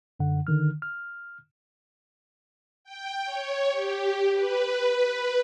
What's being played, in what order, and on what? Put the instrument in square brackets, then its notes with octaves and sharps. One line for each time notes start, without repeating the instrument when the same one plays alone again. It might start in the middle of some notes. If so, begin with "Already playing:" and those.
[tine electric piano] F#2 D3 F#5
D3 D#3 F6
F6
[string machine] G5
C#5
G4
B4